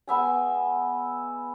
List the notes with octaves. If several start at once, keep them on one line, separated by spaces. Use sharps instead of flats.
G#3 B3 E5 G#5